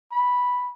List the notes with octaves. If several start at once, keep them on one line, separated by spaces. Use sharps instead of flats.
B5